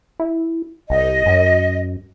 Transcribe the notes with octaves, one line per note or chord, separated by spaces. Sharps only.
E4
C2 D#5
F#2